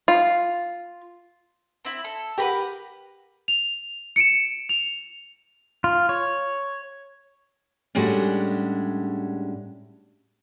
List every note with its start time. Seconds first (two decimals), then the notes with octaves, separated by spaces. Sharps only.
0.08 F4
1.85 C4 E4
2.04 A4
2.38 G4 A#4 B4 F#5
3.48 F7
4.16 C#7 D7 E7
4.69 F7
5.84 F4
6.09 C#5
7.95 A2 G3 G#3 C#4 D4 F#4